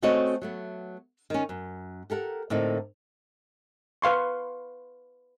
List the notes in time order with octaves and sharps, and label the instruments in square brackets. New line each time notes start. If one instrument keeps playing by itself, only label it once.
[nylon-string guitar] A3 C4 C#4 F#4 C#5 D#5
F#3 A3 B3
D#3 C#4
F#2
G4 A4 A#4 F#5
A2 D3 A#3 C4 D#4
[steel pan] B4 F5 C6 C#6